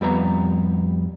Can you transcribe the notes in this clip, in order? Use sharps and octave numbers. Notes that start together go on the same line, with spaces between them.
F2 G3 B3 A#5